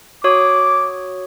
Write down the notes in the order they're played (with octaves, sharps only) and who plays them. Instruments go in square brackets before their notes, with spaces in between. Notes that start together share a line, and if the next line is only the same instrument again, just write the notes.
[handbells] F#4 C#5 D#6 [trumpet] D6